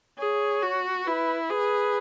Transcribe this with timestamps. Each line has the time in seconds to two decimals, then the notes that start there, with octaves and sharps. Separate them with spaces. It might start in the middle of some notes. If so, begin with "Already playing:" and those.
0.19 G#4 C#5
0.62 F#4
1.07 E4 B4
1.50 G#4 B4